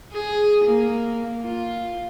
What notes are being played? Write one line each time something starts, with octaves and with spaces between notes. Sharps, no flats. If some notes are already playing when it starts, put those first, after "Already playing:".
G#4
A#3
F4